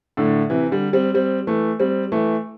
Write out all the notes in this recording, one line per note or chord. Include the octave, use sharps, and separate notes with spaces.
A2 D3
C3 E3
D3 G3
G3 C4
G3 C4
E3 A3
G3 C4
E3 A3